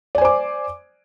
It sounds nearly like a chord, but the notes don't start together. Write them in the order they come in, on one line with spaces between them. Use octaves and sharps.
D5 G#5 C5 D6